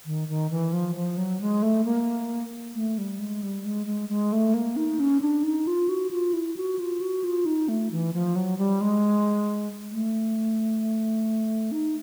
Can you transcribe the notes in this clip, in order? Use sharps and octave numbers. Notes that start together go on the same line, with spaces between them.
D#3
D#3
E3
F3
F3
F#3
G#3
A3
A#3
A3
G3
G#3
G3
G#3
G#3
G#3
A3
A#3
D#4
C#4
D4
D#4
F4
F#4
F4
E4
F#4
F4
F#4
F4
D#4
A3
E3
F3
F#3
G3
G#3
A3
D#4